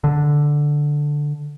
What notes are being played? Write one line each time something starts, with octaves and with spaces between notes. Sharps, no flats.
D3